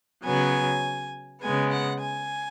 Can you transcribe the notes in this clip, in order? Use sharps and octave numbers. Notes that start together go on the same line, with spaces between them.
C#3 F#3 B3 G#5
C#3 G#3 B3 G#5
F#5
G#5